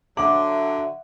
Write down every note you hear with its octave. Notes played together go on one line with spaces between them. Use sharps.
D3 F#3 E5 F#5 D6